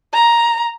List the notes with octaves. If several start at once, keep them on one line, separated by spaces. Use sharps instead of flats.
A#5